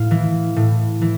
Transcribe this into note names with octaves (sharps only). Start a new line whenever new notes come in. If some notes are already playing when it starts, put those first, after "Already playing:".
Already playing: A2 F5
E3
A2
E3